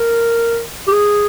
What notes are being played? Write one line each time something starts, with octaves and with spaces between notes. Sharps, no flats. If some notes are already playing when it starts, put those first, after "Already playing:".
Already playing: A#4
G4
G#4